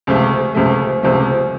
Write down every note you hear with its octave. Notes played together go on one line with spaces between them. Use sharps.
C#2 C3 F3 A3
C#2 C3 F3 A3
C#2 C3 F3 A3